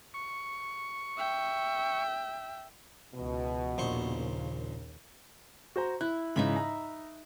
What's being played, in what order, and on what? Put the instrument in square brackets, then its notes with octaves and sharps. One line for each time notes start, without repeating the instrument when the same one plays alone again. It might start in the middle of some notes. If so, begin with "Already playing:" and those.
[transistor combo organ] C#6
[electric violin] E5 G5
[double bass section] C#2 E3 [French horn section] B2
[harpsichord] A#1 C5 C#6 [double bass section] D#2 C#3
[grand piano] F#4 C5 A#5
[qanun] E4 [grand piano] F#6
[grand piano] G#2 C#3 E3 [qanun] D#4 E5 B5
[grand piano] A#5